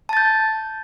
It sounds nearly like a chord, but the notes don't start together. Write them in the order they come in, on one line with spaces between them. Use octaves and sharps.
A5 A6 G6